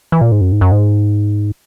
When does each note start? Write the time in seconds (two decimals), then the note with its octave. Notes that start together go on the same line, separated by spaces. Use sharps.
0.12 E3
0.21 A#2
0.32 G#2
0.41 F#2
0.52 G#2
0.61 F#2
0.72 G#2